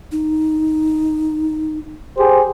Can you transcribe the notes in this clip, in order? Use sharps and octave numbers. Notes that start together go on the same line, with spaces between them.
D#4
G4 G#4 C5